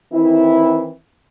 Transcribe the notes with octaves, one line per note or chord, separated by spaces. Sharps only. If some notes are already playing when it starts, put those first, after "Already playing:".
D#3 E3 C4 E4